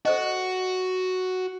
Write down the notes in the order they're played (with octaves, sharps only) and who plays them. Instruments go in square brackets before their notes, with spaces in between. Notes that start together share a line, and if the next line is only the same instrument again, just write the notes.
[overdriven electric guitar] F#4 [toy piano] A4 C5 D#5